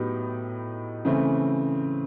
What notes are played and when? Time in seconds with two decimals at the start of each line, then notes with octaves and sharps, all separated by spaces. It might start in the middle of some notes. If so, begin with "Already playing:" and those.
Already playing: A2 F#3 B3 D#4 G4
1.05 C#3 E3 A3 C4